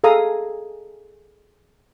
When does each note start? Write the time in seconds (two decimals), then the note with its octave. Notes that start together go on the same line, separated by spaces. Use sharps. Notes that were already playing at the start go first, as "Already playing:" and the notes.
0.04 G#4 A4 F5 A#5 D#6